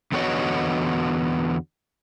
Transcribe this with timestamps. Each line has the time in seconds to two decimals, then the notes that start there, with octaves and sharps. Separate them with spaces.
0.12 E2 D3 B3 F#4 C#5 D#5